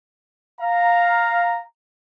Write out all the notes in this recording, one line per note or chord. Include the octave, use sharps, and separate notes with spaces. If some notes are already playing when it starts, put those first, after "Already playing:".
F5 A#5